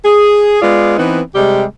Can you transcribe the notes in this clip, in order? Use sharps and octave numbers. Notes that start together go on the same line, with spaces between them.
G#4
G#3 B3 F4 D5
E3 B3 C4 D#4
C3 G3 G#3 G4